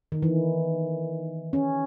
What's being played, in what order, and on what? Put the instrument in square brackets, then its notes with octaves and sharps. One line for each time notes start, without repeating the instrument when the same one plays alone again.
[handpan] D#3
E3
C#4